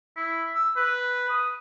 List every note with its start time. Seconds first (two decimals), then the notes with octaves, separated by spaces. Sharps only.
0.16 E4
0.55 E6
0.76 B4
1.30 D#6